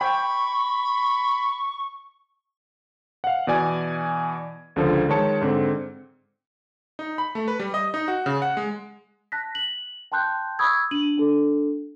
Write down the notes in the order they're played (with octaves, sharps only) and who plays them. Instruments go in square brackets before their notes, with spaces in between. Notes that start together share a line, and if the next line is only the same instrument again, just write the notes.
[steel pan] G5 [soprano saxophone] B5 [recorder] C#6
[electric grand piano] F5 F#5
B2 E3 D5 G#5 G#6
C#2 D3 F3
D#3 G#3 C#5 A5 C#7
G#2 D3 C4
D#4
B5
A3
B4
G3
D#5
D#4
F#4
C#3
F#5
G#3
[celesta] A5 F#6 A#6 B6
F#7
G5 A5 C6 F#6 G6
B5 C#6 D#6 E6 G#6
D4 D#7 F#7
D4 A4